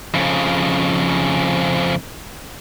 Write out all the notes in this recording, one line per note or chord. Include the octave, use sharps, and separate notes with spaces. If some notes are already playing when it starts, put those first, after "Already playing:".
F2 C#3